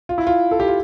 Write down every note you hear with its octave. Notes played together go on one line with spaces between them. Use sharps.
F4
E4
F4
A4
G4
F4